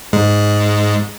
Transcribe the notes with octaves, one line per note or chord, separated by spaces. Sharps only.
G#2 G#3